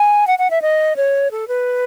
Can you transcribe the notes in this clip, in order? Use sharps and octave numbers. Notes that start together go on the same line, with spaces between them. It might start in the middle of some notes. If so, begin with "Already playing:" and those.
Already playing: G#5
F#5
F#5
E5
D#5
C#5
A4
B4